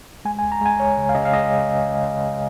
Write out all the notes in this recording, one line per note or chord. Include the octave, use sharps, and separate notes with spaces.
G#3 G#5
G#5
C#2
A#5
G#3 G#5
C#2 C#5
C#3
F5
C#3 D#5
F5
G#3 D#5